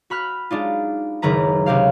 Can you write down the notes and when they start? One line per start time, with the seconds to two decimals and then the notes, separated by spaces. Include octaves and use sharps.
0.10 F#4 B5 F6 F#6
0.51 G#3 D4 D#4 F4
1.22 F#1 C#2 D#3 B4 A#5
1.66 C#2 C3 G4 F5